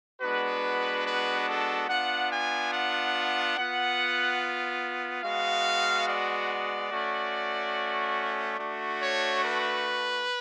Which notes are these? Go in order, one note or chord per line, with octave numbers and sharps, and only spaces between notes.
G#3 B3 D4 F#4 B4
B4
A4
B3 D4 F4 F#5
G#5
F#5
B3 F4 F#5
G#3 B3 F#4 F5
D5
A3 C#4 F#4
A3 D4 F#4
C#5
B4